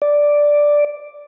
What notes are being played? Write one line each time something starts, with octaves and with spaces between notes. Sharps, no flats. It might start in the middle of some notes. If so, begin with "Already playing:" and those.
D5